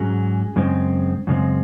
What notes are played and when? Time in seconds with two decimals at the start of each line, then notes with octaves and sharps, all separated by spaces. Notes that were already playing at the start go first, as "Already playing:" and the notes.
Already playing: G#2 F#3 C#4 G#4
0.56 F#2 C#3 G#3 C4
1.27 F#2 C#3 G#3 C4